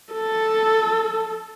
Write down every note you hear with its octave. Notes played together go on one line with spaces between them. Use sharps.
A4